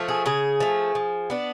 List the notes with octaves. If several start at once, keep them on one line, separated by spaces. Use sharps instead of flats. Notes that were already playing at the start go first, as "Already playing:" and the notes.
Already playing: F3 A3
G#4
C#3 G#4
F3 A3
F3
B3 D4